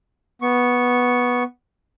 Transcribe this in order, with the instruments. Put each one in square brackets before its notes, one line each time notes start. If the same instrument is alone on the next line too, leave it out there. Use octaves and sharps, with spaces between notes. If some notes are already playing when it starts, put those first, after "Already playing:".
[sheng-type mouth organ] B3 C#6